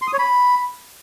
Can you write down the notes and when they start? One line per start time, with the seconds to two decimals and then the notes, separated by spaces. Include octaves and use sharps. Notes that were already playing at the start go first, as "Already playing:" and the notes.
0.02 C6
0.07 D#6
0.13 C#5
0.19 B5